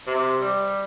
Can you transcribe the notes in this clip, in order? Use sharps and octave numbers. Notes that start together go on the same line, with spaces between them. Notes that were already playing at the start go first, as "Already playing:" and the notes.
C3
G3